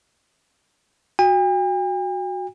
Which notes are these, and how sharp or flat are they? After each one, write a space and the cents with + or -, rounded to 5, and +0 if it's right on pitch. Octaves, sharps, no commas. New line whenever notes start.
F#4 -10 G5 +45